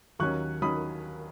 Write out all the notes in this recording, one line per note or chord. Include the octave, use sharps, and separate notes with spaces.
D#2 D#3 F#3 C#4 C#6 F#6
D#3 F#3 C#4 B5 D#6